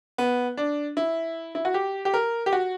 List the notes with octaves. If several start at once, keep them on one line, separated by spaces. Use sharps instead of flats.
B3
D4
E4
E4
F#4
G4
G4
A#4
G4
F#4